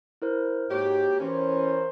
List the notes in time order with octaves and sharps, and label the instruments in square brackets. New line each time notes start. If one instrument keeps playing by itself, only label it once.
[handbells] E4 A#4 C5
[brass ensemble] G#2 [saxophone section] A#3 F#4 G4 [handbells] C#5
[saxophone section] E3 C#4 [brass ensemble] A#4 C5